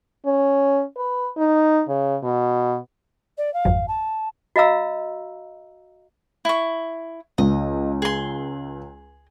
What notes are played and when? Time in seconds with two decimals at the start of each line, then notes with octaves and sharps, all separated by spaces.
0.26 C#4
0.97 B4
1.37 D#4
1.88 C#3
2.23 B2
3.37 D5
3.53 F5
3.65 G#1 F2 F#3
3.88 A5
4.56 F#4 D#5 F5 A#5 E6
6.45 E4 C#6
7.38 C#2 D#5
8.02 G#4 C6